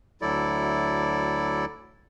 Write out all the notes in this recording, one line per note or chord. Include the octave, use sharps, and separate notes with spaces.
D2 F#3 E4 A4 D5